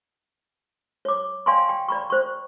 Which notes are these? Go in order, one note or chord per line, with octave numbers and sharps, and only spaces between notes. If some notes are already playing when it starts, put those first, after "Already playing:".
C#5 D6
D5 F5 G5 G#5 C6 C#6
G5
D5 B5 C#6
C5 C#6